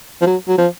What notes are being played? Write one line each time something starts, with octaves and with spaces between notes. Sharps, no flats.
F3
F#3
F#3
F3